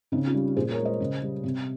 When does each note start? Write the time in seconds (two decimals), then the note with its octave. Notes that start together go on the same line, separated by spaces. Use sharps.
0.12 C#3 C4 D#4
0.26 C#4 F4
0.34 G3
0.57 A#2 G#4 C5
0.71 A#4 C#5
0.78 G#3
0.85 C5 D#5
1.00 C#3
1.22 G3
1.44 C3